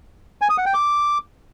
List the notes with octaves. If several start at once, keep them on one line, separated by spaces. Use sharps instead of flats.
G#5
D#6
F#5
G5
D6